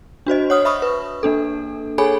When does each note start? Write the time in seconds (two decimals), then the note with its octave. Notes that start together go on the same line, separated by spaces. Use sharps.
0.26 D4 F#4 C5 D#5
0.50 C#5 F#5 D#6 F6
0.65 E5 B5 C#6 D#6
0.82 B4
1.23 A#3 D4 A4
1.98 G#4 A4 C#5 G#5 B5